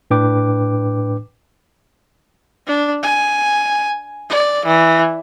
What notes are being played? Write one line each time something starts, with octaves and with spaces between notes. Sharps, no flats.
A2 D4 B4 G5 D6
D4
G#5
D5
E3